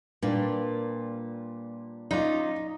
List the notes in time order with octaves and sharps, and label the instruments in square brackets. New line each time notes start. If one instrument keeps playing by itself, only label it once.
[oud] A#2 [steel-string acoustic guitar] G3 F4 [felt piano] D4 B4
[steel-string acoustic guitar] F#3 C#4 F4 [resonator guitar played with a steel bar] D#4 [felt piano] D5 D6